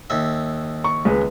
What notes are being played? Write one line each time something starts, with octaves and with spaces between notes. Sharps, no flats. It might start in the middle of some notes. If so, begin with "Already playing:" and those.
D#2 E5
C#6
C#2 G#3 B4